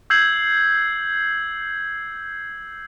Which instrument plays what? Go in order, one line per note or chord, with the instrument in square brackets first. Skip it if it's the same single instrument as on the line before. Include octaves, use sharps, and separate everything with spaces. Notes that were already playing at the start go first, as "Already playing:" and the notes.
[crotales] E6 G6 G#6 C7 F#7